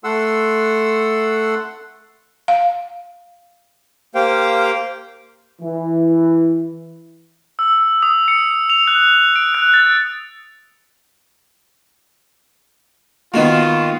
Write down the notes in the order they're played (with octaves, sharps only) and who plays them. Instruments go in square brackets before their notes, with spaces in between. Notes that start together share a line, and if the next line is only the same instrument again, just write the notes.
[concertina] A3 A4 F#5 C6 E6
[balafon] F5
[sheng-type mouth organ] A#3 G4 C5 F5 G5
[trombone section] E3
[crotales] E6
D#6
C#7
F7
F#6
D7
F#6
A6
[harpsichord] D#3 A#3 [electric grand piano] B3 F#4 [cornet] F4